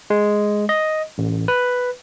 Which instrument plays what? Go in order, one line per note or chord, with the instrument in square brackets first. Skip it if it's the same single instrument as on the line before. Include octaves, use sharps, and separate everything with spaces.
[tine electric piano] G#3
D#5
A1
B4